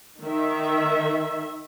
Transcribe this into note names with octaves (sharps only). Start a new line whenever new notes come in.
D#3 E5